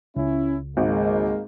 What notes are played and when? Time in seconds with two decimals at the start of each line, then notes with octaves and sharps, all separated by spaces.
0.16 C#2 C#4 E4
0.77 G#1 G#3 A#3